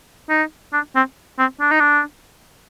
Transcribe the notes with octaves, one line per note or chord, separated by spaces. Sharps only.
D#4
D4
C4
C4
D4
D#4
D4